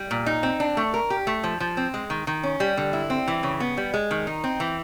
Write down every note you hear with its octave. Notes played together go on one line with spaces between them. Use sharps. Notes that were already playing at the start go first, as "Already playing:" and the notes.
Already playing: G3
A#2
D#4
C4
D4
A3
A#4
G4
A3
F3
F3
C4
G#3
D#3
D#3
C#4
G3
D3
E4
C4
E3
C#3
B3
G3
G#3
D#3
D#4
C4
E3